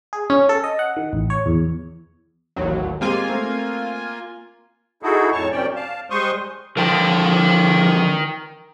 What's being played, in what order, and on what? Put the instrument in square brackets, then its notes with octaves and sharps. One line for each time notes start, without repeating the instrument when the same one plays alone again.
[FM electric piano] G#4
C#4
A4
D#5
F#5
D#3
A1
C#5
E2
[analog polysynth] A1 D#2 F#3
[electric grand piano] G#3 C4 G4 [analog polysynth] A#3 F4 G#5
[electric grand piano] A3 C4
[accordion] D#4 E4 F#4 G#4 A4
F2 A2 C#5 A5 C#6
F#2 C3 C#4 D5 G5
F5 A5
G3 G#3 C5 C6 C#6 D#6
[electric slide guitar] D3 F3 [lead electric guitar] A#4 G5